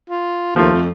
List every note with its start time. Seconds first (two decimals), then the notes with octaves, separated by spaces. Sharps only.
0.10 F4
0.56 D#2 F3 A3 F4
0.73 F2